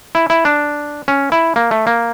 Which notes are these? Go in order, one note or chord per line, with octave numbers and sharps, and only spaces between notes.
E4
E4
D4
C#4
E4
A#3
A3
A#3